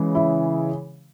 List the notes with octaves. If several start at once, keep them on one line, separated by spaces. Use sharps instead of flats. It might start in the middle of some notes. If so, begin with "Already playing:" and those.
Already playing: C#3 E3 G#3
E4